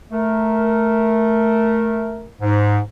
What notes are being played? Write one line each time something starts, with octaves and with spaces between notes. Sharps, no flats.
A3 A#4
G#2